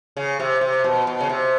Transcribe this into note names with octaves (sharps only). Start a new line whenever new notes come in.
C#3
C3
C3
B2
B2
C#3
C3